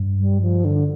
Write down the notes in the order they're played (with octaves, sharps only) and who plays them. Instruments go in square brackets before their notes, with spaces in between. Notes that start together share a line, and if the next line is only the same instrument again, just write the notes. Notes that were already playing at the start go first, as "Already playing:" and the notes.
Already playing: [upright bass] G2
[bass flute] G3
F3
D3